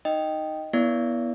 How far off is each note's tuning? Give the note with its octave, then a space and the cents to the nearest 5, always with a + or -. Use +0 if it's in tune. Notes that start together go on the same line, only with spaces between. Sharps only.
D#4 +0 D#5 +0 G5 +0
B3 -25 E4 +0 D5 -30